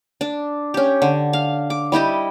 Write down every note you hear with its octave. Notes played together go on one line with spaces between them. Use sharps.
D4
C#4 G4
D3
F5
D6
G3 E4 G4 D#5